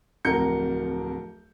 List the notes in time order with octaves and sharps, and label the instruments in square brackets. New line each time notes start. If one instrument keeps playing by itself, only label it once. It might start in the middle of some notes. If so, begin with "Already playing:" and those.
[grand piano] D1 F2 F#4 A#4 G6 C#7